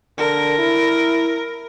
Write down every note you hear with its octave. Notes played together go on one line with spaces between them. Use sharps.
D3 A#4
E4